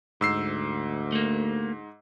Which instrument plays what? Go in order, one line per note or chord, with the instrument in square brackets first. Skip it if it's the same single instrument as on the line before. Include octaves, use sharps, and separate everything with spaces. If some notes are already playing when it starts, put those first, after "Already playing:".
[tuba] D2 [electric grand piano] G#2 E6 C7
[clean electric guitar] A3 A#3